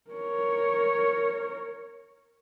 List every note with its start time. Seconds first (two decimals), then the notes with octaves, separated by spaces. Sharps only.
0.10 A#4 C#5